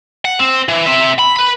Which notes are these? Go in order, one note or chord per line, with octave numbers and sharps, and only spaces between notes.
F#5
C4
E3
C4 E5
B5
B4 B5